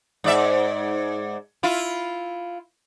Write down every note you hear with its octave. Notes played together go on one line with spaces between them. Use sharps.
G#2 D5 E5
E4 F4